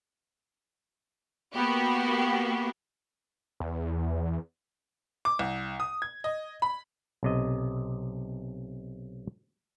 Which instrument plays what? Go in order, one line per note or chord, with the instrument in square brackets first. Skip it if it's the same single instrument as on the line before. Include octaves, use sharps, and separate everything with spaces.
[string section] A#3 B3 F#4 G4
[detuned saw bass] E2
[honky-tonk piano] D6
C2
D#6
G#6
D#5
B5
[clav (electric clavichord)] B1 C3 D#5